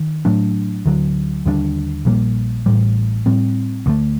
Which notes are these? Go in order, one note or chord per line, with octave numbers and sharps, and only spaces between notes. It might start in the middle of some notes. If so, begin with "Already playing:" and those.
Already playing: D#3
A2 F#3 A3 D4
D2 D3 F#3
D#2 D3 G3 D4
A#1 A#2 G3 A#3
A1 A2 G3
A2 G3 C4
D2 D3 A3